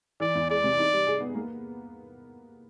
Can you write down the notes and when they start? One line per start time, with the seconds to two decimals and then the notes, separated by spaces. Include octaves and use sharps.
0.20 E3 D5
0.35 E2
0.50 G#3 D5
0.64 C3
0.78 D#4
0.93 G3
1.07 G#4
1.21 B3
1.35 A#3